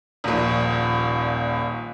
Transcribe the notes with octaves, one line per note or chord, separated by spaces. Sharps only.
D#1 A#1